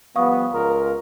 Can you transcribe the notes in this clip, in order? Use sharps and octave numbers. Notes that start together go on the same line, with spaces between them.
F3 G3 B3 F5 C#6 D#6
C#2 F4 A#4